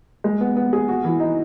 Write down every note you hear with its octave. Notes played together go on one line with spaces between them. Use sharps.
G#3
B3
B3
G#4
F#4
E3
D#4